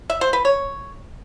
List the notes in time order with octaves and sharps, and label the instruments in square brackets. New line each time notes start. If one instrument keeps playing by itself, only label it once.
[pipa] E5
C5
B4
C#5